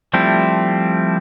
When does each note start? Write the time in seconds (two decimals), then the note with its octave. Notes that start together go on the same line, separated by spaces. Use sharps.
0.13 F3 G3 A3 C4 E4